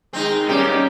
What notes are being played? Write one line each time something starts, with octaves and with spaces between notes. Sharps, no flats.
D#3 G#3 C4 D#4
D#3 G3 C#4 D#4 G4 A#4